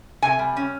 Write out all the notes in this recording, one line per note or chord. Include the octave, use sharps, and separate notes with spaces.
C3 G#5
G3
C#4